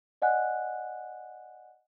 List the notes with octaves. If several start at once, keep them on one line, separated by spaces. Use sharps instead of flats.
D5 D#5 F#5 G#5 F#6